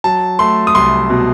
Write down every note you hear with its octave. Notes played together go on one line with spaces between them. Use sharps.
F#3 A5
A3 C6
D#6
C2 C6
B2